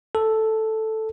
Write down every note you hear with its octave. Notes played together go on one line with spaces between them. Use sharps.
A4